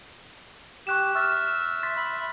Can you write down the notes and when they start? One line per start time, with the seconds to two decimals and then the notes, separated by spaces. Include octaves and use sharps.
0.87 G4 C#6 F#6 E7
1.15 E5 C#6 E6 F6 A6
1.83 C6 A6 B6
1.97 E5 B5